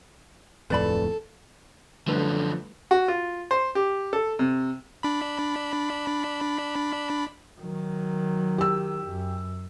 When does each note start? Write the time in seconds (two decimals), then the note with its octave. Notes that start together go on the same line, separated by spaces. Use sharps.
0.70 D1 F2 A2 A4 B4 D5 B5
2.08 F#2 D3 F3 G3 A3 B4
2.91 F#4
3.08 F4
3.51 C5
3.75 G4
4.13 A4
4.39 C3
5.03 D4 B5
7.60 D#3 F#3
8.58 G4 E6
9.06 F#2